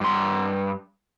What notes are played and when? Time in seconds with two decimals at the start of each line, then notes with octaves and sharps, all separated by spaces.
0.01 G2 C6